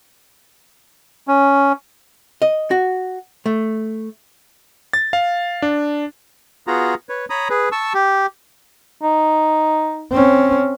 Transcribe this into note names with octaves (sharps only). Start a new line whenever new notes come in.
C#4
D#5
F#4
A3
A6
F5
D4
B3 F4 F#4 G#4 A#5
B4 C#5
C#5 A#5 B5 D#6
G#4 B4
A5 C#6 E6
G4
D#4
C4 C#4